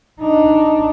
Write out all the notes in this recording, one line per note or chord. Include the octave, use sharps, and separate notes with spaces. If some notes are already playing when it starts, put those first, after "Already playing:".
D4 D#4